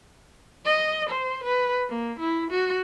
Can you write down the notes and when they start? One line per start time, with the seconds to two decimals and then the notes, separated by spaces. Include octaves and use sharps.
0.65 D#5
1.09 C5
1.43 B4
1.89 A#3
2.19 E4
2.51 F#4